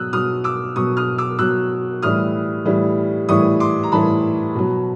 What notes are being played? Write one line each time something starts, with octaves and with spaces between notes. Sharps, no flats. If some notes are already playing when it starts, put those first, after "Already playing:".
Already playing: B2 F#3 D#6 E6 F#6
B2 F#3 D#6 F6
D6 E6
B2 F#3 C#6 D#6
D#6 F6
D6 E6
B2 F#3 E6 F#6
A2 E3 G3 D#6 F6
A2 E3 G3
A2 E3 G3 C#6 D#6
C6 D6
A#5
A2 E3 G3 A5 B5
B2 F#3